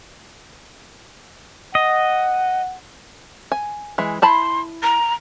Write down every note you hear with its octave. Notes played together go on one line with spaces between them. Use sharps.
D#5 F#5
G#5
E3 G#3
E4 A5 B5 C6
A#5